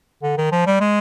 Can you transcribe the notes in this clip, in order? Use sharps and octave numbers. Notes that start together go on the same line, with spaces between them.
D3
D#3
F3
G3
G#3